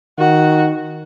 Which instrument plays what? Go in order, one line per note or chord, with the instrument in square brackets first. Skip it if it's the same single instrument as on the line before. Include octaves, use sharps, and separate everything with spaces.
[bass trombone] D#3 [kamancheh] F#4